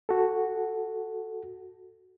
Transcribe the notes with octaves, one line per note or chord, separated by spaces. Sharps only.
F#4 A4